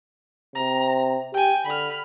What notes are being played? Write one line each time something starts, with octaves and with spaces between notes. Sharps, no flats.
C3 A#5
G4 G5 G#5
D3 B5 F6